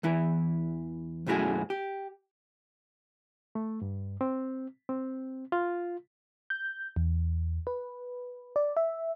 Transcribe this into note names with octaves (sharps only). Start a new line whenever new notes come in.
E2 E3 E4
B1 F#2 A3 E4 F#4 G#4
G4
A3
G2
C4
C4
F4
G6
E2
B4
D5
E5